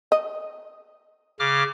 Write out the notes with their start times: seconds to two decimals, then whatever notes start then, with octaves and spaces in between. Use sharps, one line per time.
0.12 D#5
1.39 C#3 D6 F6